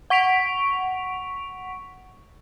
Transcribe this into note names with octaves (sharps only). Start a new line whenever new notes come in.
F#5 C#6 B6 D7 F7